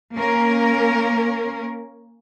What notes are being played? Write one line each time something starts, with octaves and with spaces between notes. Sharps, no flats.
A#3 C#4 A#4